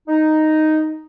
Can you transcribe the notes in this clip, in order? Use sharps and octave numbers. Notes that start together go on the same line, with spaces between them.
D#4